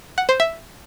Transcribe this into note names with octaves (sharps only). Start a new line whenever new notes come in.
F#5
C5
E5